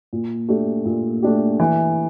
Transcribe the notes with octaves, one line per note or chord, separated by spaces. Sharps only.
A#2
A3 D4 G4
A#2
A3 D4 G4
E3